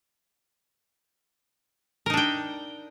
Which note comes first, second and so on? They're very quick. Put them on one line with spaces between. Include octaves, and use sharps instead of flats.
A#4 D#4 D4 G5